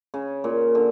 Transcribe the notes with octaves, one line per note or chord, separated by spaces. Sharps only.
C#3
A#2
D3